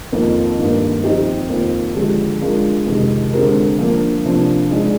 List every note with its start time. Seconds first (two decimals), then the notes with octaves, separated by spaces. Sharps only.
0.12 F2 D#3 A#3 F4
0.58 G2 D#3 A#3
1.04 F3 C4 D#4 G4
1.49 F2 D#3 A#3 F4 C5
1.95 D3 F3 G#3 D4 G4
2.42 G#3 D4 F4 A#4
2.87 F2 C3 D#3 G#3
3.33 D3 G#3 C4 G4 A#4
3.79 F3 A#3 D4
4.24 C3 F3 A#3 D4
4.70 G#3 D#4 G#4 D5